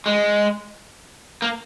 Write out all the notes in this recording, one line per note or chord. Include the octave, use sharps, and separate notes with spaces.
G#3
A#3